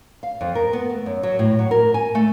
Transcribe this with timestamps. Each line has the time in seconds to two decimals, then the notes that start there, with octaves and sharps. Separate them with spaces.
0.23 F5
0.41 F2
0.55 A#4
0.73 B3
0.89 A3
1.06 F#2
1.23 F#3
1.39 A2
1.59 F#3
1.71 A#4
1.94 G#5
2.15 A3